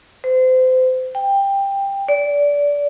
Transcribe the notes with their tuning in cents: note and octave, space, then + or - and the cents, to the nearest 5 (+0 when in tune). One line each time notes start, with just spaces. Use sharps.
C5 -30
G5 +15
D5 -20